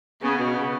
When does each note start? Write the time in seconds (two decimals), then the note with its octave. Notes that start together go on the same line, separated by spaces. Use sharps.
0.22 C#3 B3
0.40 B2
0.55 C#3